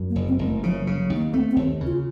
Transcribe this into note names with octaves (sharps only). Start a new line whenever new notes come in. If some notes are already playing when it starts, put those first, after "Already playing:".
Already playing: F#2
A#3
F#1
C4
F#1
A3
C#3 F3
F#3
C#3
F#3
D#2
A#3
A3 C4
C4
D#2
C#3
F4